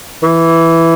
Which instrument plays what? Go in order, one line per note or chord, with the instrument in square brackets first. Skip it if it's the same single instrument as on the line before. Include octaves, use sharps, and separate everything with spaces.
[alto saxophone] E3